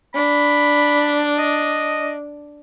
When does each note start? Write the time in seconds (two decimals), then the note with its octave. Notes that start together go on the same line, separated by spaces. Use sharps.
0.15 D4 B5
1.39 D#5